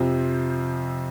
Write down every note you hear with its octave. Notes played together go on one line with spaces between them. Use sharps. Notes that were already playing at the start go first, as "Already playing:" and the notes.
Already playing: F2 C3 F3 C4